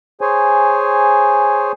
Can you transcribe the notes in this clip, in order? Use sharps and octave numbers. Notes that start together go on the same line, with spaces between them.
G#4 C5 C#5 G#5